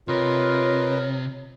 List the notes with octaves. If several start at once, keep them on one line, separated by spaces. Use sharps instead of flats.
C3 F4 A#4 B4 C#5 D#5